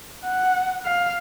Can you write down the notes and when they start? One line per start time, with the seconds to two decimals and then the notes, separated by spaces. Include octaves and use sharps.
0.25 F#5
0.85 F5